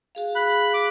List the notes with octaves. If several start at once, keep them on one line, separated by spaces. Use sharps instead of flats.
F#4 G#4 F5
B5 F#6
D6